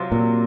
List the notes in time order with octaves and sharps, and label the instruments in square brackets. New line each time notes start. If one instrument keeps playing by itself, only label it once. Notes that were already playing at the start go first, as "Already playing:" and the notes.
Already playing: [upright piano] C3 F#3 F4
[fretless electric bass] A#2